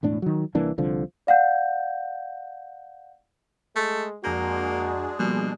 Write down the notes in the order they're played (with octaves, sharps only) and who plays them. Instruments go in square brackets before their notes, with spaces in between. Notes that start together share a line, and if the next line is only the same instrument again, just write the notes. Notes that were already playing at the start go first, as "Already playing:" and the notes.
[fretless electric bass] E1 A2 D4
D#3 F#3
C2 E3 A#3 D4
C2 D3 F3
[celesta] D5 F5 F#5 G6
[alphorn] G#3 [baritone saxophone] A3
[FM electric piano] F2 A#5 G6 [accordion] G#3 D4 G#4 [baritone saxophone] A#3 [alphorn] F#4
[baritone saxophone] B2 [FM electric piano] F3 G3 A#3